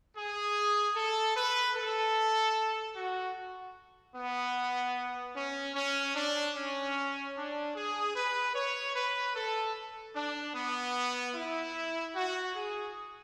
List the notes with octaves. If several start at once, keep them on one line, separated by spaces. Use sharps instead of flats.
G#4
A4
B4
A4
F#4
B3
C#4
C#4
D4
C#4
D4
G#4
B4
C#5
B4
A4
D4
B3
E4
F#4
G#4